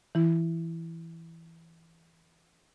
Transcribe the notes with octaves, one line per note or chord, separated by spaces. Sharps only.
E3 E4